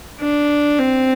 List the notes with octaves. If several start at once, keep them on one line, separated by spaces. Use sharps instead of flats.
D4
C4